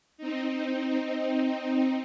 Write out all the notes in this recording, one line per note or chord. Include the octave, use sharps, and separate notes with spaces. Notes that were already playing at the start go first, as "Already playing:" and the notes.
C4 D#4